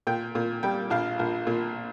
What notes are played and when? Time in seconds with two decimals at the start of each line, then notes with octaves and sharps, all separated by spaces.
0.07 A#2 G5
0.35 A#2
0.63 G3 G5
0.90 A#1 F5
1.19 A#1
1.47 A#2